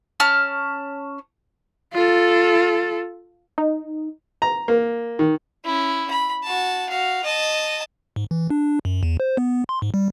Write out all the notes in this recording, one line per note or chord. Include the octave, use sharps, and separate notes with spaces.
C#4 A5 F6
F4 A4
D#4
A#5
A#3
D#3
C#4 E4
B5
F#4 A5
F#4 F5
D#5 A5
G#2
E3
D4
F#2
E2
C5
B3
C6
G#2
G3